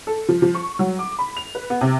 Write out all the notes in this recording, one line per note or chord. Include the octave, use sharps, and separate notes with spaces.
A4
F3
F3
C#6
F#3
D6
B5
F7
B4
B3
C3